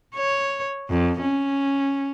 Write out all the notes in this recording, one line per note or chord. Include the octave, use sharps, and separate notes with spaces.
C#5
F2
C#4